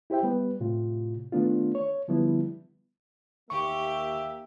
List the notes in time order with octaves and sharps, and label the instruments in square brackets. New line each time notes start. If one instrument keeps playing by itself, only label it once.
[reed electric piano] E4 G4 C5 E5 G5
G3 B3 B4
A2 C3 F4
D#3 A3 B3 D4 F4
C#5
D3 F3 G3 B3 E4
[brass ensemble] D#2 A#3 E5 [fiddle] G4 [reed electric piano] C#6